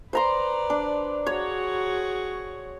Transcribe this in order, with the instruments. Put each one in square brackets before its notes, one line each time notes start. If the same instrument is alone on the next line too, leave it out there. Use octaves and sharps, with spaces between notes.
[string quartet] B4 D5 [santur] C5 A#5 C6
[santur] D4
[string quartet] F#4 G#4 C#6 [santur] C#5